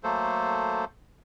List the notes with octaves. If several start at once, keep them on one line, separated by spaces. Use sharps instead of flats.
F#3 A3 A#3 A4 C5